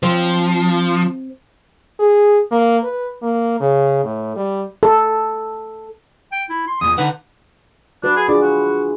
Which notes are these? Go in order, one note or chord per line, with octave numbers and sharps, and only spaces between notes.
F3 C4
G#4
A#3
B4
A#3
C#3
A2
G3
A4
G5
E4
C6
E2 A#2 D#6
D3 D#4 B4 F#5
D4 F#4 B4
G#4
D4 F4 G#4 D5
F#4